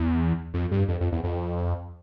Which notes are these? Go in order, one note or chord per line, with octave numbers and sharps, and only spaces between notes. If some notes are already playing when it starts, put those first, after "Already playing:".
Already playing: E2
F2
G2
F2
F2
E2
F2